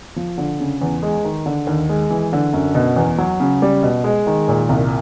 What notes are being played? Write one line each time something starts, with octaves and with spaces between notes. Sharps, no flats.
F3
D3
C#3
E2
G#3
D#3
D3
D#2
G#3
E3
D3
F#2
B2
E2
F#3
C#3
G3
B2
G#3
D#3
A#2
C2